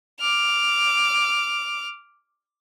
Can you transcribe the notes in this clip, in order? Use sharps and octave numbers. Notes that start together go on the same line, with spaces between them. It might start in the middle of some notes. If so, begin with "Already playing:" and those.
D6 F6